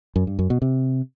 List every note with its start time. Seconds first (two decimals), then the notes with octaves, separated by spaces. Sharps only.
0.16 F#2
0.27 G2
0.39 F#2
0.50 B2
0.62 C3